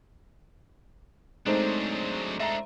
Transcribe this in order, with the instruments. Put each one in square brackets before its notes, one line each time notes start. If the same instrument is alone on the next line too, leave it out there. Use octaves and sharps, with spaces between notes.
[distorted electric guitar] F#3 D4 [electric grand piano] G#3 A3 C5 [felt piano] C4 D#4
[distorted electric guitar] D4 D#4 [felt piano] E5 A#5